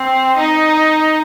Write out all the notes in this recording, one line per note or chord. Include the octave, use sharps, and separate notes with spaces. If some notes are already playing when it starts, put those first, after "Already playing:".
Already playing: C4
D#4